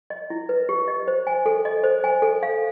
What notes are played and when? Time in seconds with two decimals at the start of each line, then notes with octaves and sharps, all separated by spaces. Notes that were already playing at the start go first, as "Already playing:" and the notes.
0.10 D#5
0.30 E4
0.49 B4
0.69 G4
0.88 D#5
1.08 C5
1.27 G#5
1.46 A4
1.65 D#5
1.84 C5
2.04 G#5
2.22 A4
2.43 F5